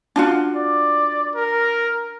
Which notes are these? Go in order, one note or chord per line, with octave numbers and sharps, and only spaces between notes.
D4 F4 F#4
D5
A#4